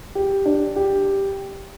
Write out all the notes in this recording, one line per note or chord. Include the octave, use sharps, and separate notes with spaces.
G4
D4
G4